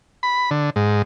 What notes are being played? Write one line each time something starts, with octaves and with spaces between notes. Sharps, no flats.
B5
D3
G#2